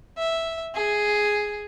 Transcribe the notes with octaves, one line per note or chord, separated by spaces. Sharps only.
E5
G#4